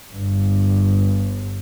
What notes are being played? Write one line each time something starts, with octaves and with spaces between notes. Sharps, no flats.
G1 G2